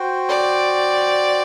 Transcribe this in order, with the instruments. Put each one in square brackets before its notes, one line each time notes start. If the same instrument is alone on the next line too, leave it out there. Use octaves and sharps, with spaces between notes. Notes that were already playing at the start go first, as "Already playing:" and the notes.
Already playing: [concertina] F#4 C5 G5
[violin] D5